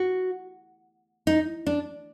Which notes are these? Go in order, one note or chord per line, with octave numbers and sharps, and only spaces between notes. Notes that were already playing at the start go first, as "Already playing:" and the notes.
Already playing: F#4
D#4
D4